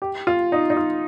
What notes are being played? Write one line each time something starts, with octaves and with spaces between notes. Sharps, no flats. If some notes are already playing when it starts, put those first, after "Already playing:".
G4
F4
D#4
D#4
F4